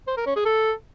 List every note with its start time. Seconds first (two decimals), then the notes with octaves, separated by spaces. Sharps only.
0.08 C5
0.17 A#4
0.27 C#4
0.36 G#4
0.46 A4